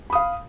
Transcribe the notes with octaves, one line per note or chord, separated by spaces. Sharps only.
F5 B5 D#6